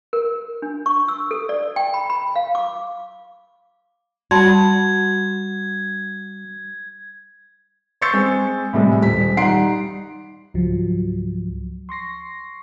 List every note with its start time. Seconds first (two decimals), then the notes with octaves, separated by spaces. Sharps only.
0.13 A#4
0.62 D4
0.86 C#6
1.08 E6
1.31 A4
1.49 D5
1.76 G5
1.94 B5
2.10 B5
2.36 F5
2.55 D6
4.31 G3 F#4 A5 B5 C6 G#6
8.02 C6 C#6 E6 G6 A6 C#7
8.13 G#3 C4
8.73 A2 C3 G3 G#3
9.02 D#1 B6
9.37 G3 D#4 F#5 C6 C7 D7
10.54 C#2 G#2 F3 F#3
11.89 C6 C#6 A#6 C7